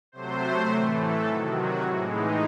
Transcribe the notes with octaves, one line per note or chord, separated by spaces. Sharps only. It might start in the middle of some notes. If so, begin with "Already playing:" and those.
C3 F#3 A3 C5
A2 E3 A3
A4
C3 D#3 F#3
F#4
A2 E3 G#3 E4
D#4